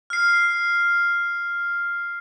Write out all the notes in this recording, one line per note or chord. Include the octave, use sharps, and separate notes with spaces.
F6 C7